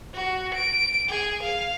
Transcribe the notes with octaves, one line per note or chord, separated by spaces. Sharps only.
F#4
D7
G#4
F5